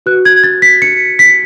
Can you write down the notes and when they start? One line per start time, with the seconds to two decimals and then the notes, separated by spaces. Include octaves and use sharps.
0.06 F#4 B4 F#6
0.25 G#6
0.44 A6
0.62 B6
0.82 C#7
1.19 B6